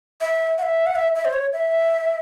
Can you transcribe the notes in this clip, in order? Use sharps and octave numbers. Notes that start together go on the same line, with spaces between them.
E5
F#5
E5
F#5
E5
E5
C5
C#5
E5